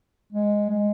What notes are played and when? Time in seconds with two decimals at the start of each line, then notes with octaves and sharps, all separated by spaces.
0.32 G#3
0.69 G#3